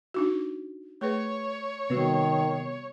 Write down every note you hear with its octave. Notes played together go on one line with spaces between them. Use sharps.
D4 D#4 F#4
A3 G#4 B4 C#5
C3 D#3 G3 B3 F#4 B4 C7